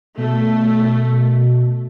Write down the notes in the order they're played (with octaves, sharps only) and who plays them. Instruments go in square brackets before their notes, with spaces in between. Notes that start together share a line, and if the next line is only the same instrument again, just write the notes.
[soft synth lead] B2 [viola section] A3